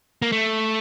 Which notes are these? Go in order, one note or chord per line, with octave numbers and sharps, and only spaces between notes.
A#3
A3